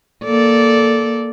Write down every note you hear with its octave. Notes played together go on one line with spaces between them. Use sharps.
A#3 A4 D5